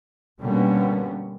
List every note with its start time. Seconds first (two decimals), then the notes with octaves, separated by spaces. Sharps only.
0.40 B2 D3 G3 A#3 B3 C#4